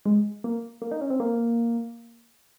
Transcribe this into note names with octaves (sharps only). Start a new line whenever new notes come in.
G#3
A#3
A#3
D#4
C#4
C4
A#3